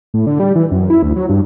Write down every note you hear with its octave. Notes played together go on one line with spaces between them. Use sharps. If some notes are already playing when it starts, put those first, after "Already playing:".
A2
D3
G3
E3
F#2
E4
D2
F#3
G2